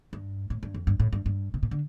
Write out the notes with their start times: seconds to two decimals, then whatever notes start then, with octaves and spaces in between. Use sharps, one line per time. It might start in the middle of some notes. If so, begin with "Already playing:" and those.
0.13 G2
0.50 A2
0.63 G2
0.74 F2
0.87 G2
1.00 A2
1.13 G2
1.26 G2
1.54 C3
1.63 A#2
1.71 D3